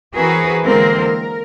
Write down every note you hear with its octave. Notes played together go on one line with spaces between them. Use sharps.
E3 C4 F#4 G#4 A#4 B4
D3 E3 G#3 A#3 C4 A#4
A#4